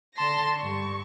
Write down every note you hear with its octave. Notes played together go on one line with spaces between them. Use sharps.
D3 A5 C6 A#6
G2 C#6